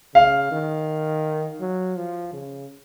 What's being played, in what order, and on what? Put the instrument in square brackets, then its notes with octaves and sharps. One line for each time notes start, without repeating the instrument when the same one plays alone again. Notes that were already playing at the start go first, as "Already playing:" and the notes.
[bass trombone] C#3 [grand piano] F5
[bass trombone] D#3
F#3
F3
C#3